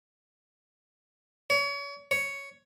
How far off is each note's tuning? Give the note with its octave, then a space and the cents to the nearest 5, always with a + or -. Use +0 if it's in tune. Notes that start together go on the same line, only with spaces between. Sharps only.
C#5 +35
C#5 +5